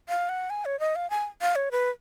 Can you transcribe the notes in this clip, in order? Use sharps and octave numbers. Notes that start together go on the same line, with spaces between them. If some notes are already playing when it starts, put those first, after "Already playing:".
F5
F#5
G#5
C#5
D#5
F5
G#5
F5
C#5
B4